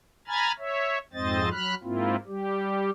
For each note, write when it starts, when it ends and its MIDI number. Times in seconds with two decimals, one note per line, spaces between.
0.28 0.52 80
0.28 0.52 82
0.28 0.52 83
0.28 0.52 89
0.28 0.52 92
0.28 0.52 93
0.58 0.98 73
0.58 0.98 76
1.13 1.49 41
1.13 1.49 44
1.13 1.49 60
1.13 1.49 72
1.13 1.49 75
1.13 1.49 93
1.51 1.75 54
1.51 1.75 83
1.51 1.75 89
1.51 1.75 90
1.83 2.16 44
1.83 2.16 58
1.83 2.16 60
1.83 2.16 64
1.83 2.16 65
2.27 2.90 55
2.27 2.90 67